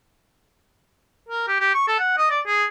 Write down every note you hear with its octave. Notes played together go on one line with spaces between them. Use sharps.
A#4
G4
G4
C#6
A4
F#5
D#5
D5
G#4